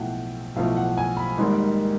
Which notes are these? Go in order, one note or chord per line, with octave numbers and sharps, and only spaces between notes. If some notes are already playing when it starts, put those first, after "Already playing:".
Already playing: B1 A2 F3 A3 F#5 G5
B1 A2 F3 A3 F5
F#5
G#5
B5
G#1 G#2 D#3 G3 A#3